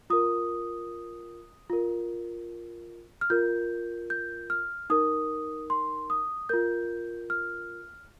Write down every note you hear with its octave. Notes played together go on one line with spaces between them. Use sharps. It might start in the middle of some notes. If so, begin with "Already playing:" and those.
F4 A#4 D#6
F4 A#4
F6
F4 A#4 G6
G6
F6
D#4 A#4 D#6
C6
D#6
F4 A#4 G6
F6